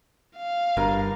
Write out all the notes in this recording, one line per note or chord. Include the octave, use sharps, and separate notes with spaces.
F5
G1 G2 A#4